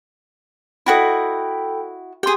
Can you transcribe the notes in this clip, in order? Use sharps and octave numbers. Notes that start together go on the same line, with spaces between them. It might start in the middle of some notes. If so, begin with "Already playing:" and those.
E4 F#4 A4 D#5 G5 B5
G4 G#4 G5 C6